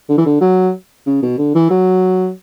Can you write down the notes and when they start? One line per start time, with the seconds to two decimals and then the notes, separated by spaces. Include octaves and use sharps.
0.09 D3
0.18 E3
0.26 D3
0.41 F#3
1.06 C#3
1.22 B2
1.38 D3
1.55 E3
1.71 F#3